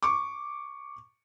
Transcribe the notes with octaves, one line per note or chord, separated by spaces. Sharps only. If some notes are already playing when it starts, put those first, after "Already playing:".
C#6 D6